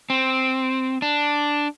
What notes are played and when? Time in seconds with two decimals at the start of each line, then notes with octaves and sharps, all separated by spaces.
0.10 C4
1.02 D4